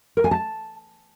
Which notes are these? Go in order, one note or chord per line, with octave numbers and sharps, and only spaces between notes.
A#4
G#5
A5